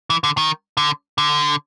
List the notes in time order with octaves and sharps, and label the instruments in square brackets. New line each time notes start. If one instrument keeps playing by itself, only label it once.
[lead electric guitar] E3
D3
D#3
D3
D3